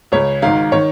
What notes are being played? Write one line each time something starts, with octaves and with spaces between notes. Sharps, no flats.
C#2 C#3 C#5
G#1 G#2 D#3 F5
D#3 C#5